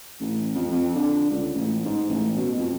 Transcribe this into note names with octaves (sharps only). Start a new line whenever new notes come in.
A1
F2
F2
D3
C#2
A1
G#2
A1
B2
F2